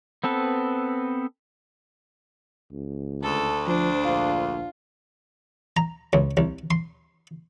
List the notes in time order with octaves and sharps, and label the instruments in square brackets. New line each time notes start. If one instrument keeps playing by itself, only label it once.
[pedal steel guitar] B3 C4 A4 B4
[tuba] C#2
[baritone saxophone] D2 [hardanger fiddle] A4
[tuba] F3 [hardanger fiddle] D4 C5
[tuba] A#1 [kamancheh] F4
[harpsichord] A#5
C#2
C2
C6